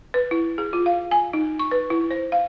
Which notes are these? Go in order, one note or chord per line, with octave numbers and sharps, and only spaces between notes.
B4
E4
G#4
F4
F5
G#5
D#4
C#6
B4
E4
C5
F5